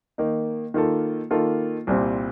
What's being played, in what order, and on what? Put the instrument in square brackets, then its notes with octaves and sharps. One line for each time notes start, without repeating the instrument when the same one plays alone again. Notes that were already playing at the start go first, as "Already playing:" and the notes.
[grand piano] D#3 A#3 D#4
D#3 A#3 F4 A4
D#3 A#3 F4 A4
C2 A#2 G3 C4